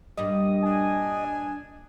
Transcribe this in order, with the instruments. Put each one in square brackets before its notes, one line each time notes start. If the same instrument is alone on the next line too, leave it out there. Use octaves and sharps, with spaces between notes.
[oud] G2 A#2 G3 [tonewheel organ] D#5
[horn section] D4 G#5